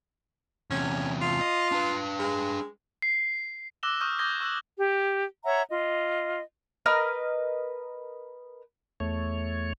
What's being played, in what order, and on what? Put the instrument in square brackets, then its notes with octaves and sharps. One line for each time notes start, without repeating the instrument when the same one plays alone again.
[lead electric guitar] E2 C3 [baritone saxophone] C#4
[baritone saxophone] F4
[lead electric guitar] D#5
D4 B4
[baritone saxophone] G#3
[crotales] C7
D6 E6 F#6 A#6 E7 G7
C#6 D#6 F6 G6
D6 D#6 G6 G#6 A#6 G7
C#6 E6 F#6 A#6 F#7
[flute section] G4
C#5 E5 F#5 A#5
F4 D#5
[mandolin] A#4 B4 D#5 F6
[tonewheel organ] E2 A3 C#5